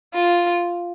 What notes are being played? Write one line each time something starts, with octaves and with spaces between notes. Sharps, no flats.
F4